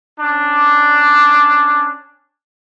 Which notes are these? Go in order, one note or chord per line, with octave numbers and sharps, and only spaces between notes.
C#4 D4 D6